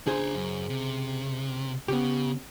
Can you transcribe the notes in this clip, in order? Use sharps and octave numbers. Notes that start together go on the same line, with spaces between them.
C#3 D4 G#4 C5 A#5
F#2
C3
C#3 B3 G4